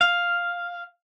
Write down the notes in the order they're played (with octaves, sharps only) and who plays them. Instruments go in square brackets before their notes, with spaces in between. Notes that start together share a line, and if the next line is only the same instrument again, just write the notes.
[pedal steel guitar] F5